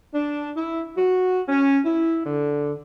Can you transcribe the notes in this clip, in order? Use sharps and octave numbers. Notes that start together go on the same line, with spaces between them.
D4
E4
F#4
C#4
E4
D3